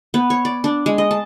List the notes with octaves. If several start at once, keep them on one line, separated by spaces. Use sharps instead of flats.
B3
C#5
D5
D4
G#3
D#5
A5